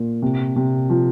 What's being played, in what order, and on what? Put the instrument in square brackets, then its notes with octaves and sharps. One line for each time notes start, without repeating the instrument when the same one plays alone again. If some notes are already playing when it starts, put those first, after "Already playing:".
Already playing: [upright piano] A#2
C3
C3
F3